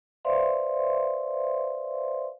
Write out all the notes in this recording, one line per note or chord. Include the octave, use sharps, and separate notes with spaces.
B4 C5 D5 E5 F5 C6